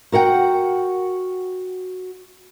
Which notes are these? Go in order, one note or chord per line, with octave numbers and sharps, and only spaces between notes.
F#4 A#4 F#5 G5